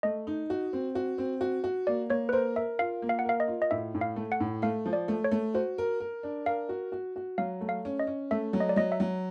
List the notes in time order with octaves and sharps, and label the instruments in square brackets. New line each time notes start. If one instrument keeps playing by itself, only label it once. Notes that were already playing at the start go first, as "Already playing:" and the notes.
[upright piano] A3 [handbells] D#5
[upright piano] D#4
F#4
C4
F#4
C4
F#4
F#4
[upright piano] A#3 [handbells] D5
[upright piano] A#3 [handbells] C#5
[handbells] B4
[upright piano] A#4 [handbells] C5
[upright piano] A#4 [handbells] E5
[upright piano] F4 [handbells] F5
[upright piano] A#3
[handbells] F5
F#5
[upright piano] A#4 [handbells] F5
[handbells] D#5
[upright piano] F4
[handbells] D#5
[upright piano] A2 [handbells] E5
[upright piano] A2
[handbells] F5
[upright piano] A3
[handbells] F#5
[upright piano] A2
[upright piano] A3 [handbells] F5
[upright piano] F3
[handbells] D5
[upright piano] A3
[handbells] C#5
[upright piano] A3
[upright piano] F#4 [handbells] C5
[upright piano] A#4
A#4
D4
[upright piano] A#4 [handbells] F5
[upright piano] F#4
F#4
F#4
[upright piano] F#3 [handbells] F5
[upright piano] A3
[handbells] F5
[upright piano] C#4
[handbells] D#5
[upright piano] C#4
[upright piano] A3 [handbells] E5
[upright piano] F#3
[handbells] D#5
D5
[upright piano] F#3 [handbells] D#5
[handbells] E5
[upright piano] F#3